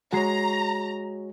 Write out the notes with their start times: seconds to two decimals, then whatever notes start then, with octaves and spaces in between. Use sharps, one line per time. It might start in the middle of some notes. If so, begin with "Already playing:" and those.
0.13 G#3 F#4 C#5 A#5 C7